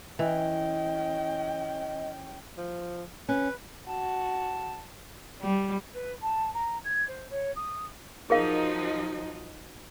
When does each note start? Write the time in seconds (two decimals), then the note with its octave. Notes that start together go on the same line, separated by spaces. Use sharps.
0.19 E3 C#4 D#5 G5
2.58 F3
3.29 C#4 B4
3.88 F#4 A5
5.42 G3
5.93 B4
6.21 A5
6.53 A#5
6.84 G#6
7.07 C5
7.30 C#5
7.55 D#6
8.30 F3 F#3 D#4 G#4 A#4 F5